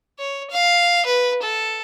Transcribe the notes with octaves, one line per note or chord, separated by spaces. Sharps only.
C#5
F5
B4
A4